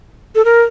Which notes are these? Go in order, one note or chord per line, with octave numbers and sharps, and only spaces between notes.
A4
A#4